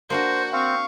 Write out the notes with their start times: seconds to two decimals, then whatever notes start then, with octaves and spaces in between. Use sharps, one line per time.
0.10 A#3 D4 F#4 A#4 C5
0.53 C4 F5 C#6